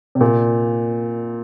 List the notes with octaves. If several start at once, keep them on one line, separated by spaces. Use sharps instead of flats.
C3
A#2